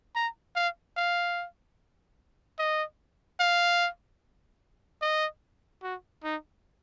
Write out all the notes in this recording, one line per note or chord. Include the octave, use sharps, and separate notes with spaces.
A#5
F5
F5
D#5
F5
D#5
F#4
D#4